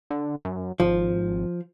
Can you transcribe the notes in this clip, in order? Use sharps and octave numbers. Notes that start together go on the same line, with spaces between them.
D3
F#2
G#1 F3